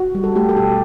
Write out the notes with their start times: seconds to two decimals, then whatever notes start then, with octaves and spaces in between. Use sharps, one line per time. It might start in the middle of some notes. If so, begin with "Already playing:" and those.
Already playing: F#4
0.15 G3
0.24 A4
0.36 A3 G4
0.49 A4
0.56 B2 G4